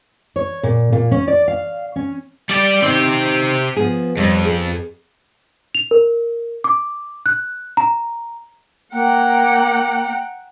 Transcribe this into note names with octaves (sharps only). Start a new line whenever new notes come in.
C#5
A#2
A#2
C#4
D5
F5
C#4
G3 D5
D#3 C4 G4
F3 B3 G#4
F2 G3 C#5
G#4
F7
A#4
D6
F#6
A#5
A#3 F#5 G5 A#5